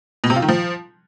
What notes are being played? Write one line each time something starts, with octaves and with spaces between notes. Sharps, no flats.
B2
C3
F4
D#3
F3